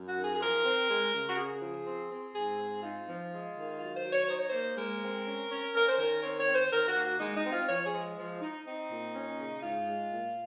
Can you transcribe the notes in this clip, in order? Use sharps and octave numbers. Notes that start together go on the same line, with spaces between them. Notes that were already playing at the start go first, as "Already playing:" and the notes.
Already playing: F#2
F#4
D#3
G#4
G#4
F3 A#4
C4
G#3
C#3
F#4
C#3 G#4
F3
C4
C4
G#2 G#4
C4
D#4 F4
F3
G#3
D#3
F#3 F4
C5
F#3
C#5
D#4 C5
C#5
C5
A#3
G#3 A#4
C4
C#4
C#4
C#4 A#4
C5
D#3 A#4
C4 C#5
C#5
C4
C5
D#3 A#4
F#4
A#3
F#4
G#3 D#4
D#4
C4
F4
F3 C#5
G#4
G#3
F3
D#4
C4 D#4
A#2
C#4
C#3
G#2 F4
G#3
A#2